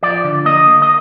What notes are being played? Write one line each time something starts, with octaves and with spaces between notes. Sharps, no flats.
F3 D5
D3
A#3 D#5
A#3
D#5